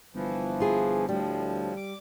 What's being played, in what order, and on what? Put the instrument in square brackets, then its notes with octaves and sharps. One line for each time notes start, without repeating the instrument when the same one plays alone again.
[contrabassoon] G1 [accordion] E3 F3
[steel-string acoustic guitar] F4 G#4
[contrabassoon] D2 [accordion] A2 F3 [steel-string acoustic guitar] G3
[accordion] D6